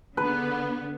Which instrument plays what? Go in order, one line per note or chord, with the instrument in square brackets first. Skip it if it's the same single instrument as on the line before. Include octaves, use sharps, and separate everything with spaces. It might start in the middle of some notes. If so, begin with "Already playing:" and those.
[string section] D3 B3 [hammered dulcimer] B4